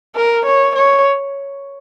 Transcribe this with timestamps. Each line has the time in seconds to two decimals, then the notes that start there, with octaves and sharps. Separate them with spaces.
0.16 A#4
0.46 C#5
0.76 C#5